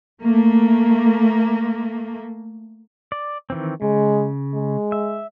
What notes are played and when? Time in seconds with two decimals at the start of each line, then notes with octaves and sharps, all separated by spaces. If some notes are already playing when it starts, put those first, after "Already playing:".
0.21 A3 A#3
3.12 D5
3.50 D#3 E3 C4
3.82 C#3 G#3
4.54 G#3
4.92 E5